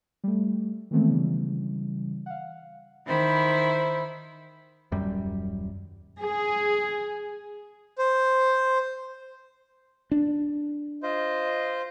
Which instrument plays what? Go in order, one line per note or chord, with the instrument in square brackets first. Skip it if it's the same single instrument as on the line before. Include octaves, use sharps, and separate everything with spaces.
[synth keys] G3 A3
D#3 E3 G#3 A3 B3 C4
C#3 E3 G3
F5 F#5
[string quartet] D#3 E4 C5 B5
[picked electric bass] D#1 F#2 G3
[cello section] G#4
[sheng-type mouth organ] C5
[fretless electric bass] D4
[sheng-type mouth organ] F4 C5 [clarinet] D#5